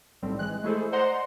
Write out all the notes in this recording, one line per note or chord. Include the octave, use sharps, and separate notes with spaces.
B1 A2 G3 C4
E3 G#3 F#6
G#3 A3 E4 G#4 A4 C5
C5 D5 D#5 F#5 A#5 C6